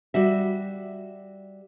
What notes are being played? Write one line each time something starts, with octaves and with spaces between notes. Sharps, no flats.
G3 F#4 E5